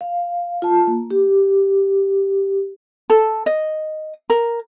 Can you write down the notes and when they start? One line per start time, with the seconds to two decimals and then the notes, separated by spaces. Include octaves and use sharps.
0.01 F5
0.62 F4 A5
0.87 A#3
1.10 G4
3.10 A4
3.46 D#5
4.30 A#4